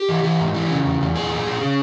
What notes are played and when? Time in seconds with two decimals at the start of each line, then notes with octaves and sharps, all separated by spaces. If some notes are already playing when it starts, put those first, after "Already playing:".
Already playing: G4
0.09 E3
0.23 E3
0.40 G#2
0.55 E3
0.70 C#3
0.85 E2
1.01 E2
1.15 A#2 G#4
1.31 A#2
1.46 A#2
1.61 C#3